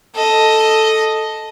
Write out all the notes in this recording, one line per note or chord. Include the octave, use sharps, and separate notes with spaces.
A4 D#5